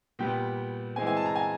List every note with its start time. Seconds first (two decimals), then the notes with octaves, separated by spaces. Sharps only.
0.19 A#2 G3 B3 G5
0.96 E3 G#3 C4 G#5
1.07 G#5
1.17 A5
1.26 A#5
1.35 G#5